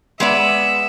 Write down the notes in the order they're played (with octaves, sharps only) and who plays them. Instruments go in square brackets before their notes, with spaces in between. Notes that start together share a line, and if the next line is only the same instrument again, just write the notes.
[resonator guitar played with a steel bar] G#3 B3 D5 [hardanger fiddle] E5